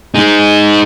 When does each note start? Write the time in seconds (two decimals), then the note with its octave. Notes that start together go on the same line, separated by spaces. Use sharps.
0.15 D#4 G#4